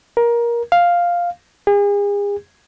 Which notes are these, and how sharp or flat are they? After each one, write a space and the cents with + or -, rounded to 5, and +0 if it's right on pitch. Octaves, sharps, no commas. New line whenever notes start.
A#4 +20
F5 +0
G#4 -40